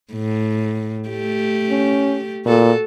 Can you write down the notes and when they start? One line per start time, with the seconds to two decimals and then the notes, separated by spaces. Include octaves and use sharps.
0.13 A2
1.09 A3 G4
1.70 C#4
2.46 A#2 F#4 A4